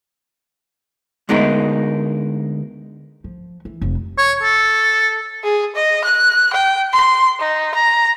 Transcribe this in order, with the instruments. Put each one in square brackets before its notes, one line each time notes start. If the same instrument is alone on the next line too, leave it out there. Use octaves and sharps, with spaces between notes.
[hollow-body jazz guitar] D2 G#3 B3 D#4 A#4
[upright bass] F3
E3
F1
[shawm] C#5
A4
[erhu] G#4
D#5
F#6
G5
C6
D#4
A#5